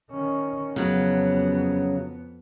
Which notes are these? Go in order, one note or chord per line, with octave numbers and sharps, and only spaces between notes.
D#3 C#4
F2 C#3 F#3 B3